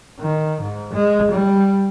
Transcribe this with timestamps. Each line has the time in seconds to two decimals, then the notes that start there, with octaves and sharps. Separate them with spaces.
0.20 D#3
0.61 G#2
0.93 G#3
1.31 G3